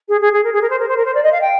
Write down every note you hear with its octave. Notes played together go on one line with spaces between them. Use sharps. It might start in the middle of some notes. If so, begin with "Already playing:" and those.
G#4
G#4
G#4
A#4
G#4
A#4
C5
A#4
C5
A#4
C5
D5
D#5
F5
G5